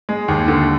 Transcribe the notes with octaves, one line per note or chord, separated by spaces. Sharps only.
G#3
D#2
D3